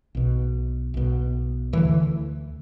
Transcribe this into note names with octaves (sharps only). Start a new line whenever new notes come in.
B1 B2
B1 B2
D2 D3 E3